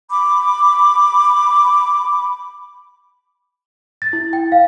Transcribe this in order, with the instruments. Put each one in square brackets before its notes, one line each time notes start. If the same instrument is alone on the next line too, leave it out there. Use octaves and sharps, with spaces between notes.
[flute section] B5 D6
[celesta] A6
E4
G5
F5